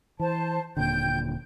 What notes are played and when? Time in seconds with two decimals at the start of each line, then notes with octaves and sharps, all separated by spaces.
0.20 E3 C5 A5
0.77 D#1 A#2 D3 G5 G6